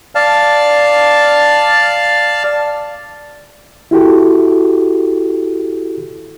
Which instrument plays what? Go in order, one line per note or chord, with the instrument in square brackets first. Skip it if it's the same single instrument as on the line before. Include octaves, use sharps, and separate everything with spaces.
[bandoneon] D5 F5 A5 F6
[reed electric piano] E4 F#4 G4 A4